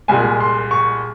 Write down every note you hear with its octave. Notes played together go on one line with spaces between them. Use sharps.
C2 A#2 G#3 G#5
C6
C#6